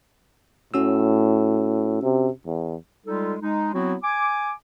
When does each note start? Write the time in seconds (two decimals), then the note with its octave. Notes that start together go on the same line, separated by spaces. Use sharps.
0.74 A2 C#4 F#4 E6
2.03 C3
2.46 E2
3.06 G3 G#3 D#4 F4 A4
3.41 G#3 D#4
3.74 F#3 B3 C4 E4 F#4
4.04 G#5 D6